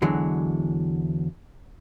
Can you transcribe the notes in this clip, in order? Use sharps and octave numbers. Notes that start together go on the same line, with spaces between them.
E2 D3 E3 F#3 G#3